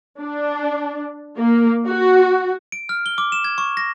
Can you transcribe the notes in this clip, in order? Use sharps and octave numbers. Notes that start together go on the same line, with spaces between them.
D4
A#3
F#4
D7
F6
G7
D6
E7
G#6
C#6
A#6